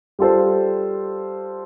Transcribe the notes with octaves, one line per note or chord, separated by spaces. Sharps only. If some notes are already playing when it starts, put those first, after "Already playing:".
G3 F4 A4 C5